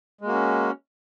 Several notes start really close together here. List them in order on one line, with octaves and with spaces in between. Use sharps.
G#3 A#3 F#4 C#4